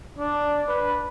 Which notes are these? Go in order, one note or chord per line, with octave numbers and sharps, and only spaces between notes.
D4
B4